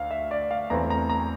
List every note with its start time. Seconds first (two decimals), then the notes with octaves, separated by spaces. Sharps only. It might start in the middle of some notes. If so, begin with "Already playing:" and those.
Already playing: D2 F5
0.11 E5
0.31 D5
0.51 F5
0.70 E2 E3 A3 C4 A#5
0.90 A#5
1.10 A#5